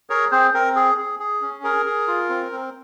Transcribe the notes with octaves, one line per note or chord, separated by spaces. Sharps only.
G#4 A#4 C#5
C4 G#4 C5
C4 A#4
G#4
G#4
G#4
C#4
G#4 A#4
G#4
F4
C4
C4